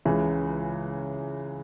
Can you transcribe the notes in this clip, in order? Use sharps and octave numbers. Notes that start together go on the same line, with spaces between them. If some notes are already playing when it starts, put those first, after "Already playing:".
C#2 C#3 E3